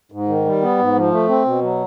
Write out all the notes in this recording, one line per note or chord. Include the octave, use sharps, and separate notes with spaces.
G#2
D#3
G3
B3
G#2
F3
A3
C4
B2
F#3